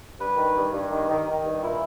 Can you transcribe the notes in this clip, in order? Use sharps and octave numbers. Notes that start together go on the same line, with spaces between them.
G2 B4
D#3
G2
G2
D#3
D#3
D#3
G2
A#2 E4